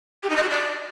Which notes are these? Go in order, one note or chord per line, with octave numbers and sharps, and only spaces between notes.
G4
D#4
D#5
F#4
D5